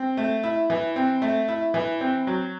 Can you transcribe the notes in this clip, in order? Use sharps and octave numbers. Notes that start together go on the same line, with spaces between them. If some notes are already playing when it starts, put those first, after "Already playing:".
Already playing: C4
A3
E4
E3
C4
A3
E4
E3
C4
F#3